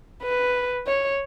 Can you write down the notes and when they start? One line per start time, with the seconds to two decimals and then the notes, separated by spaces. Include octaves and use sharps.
0.23 B4
0.87 C#5